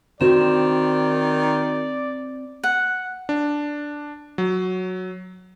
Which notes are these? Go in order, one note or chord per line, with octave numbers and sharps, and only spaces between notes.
D#3 C4 F#4 D5 E7
F#5
D4
F#3